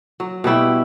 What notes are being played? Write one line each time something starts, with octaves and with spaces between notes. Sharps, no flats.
F#3
B2 G3 E4 G5